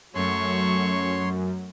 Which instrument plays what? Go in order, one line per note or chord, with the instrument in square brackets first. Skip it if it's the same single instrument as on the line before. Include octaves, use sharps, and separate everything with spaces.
[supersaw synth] F#2 [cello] F#3 [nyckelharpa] A3 C#6 [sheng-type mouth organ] C#5 C6